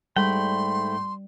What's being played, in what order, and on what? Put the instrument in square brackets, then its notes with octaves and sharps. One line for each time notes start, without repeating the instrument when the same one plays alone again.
[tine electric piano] G#2 A3 B5 [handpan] G3 [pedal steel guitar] G5 [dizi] C6